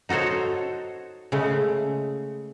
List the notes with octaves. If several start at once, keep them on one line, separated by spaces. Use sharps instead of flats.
D#4 F#4 A4 C5 C#5
C#3 G#3 A3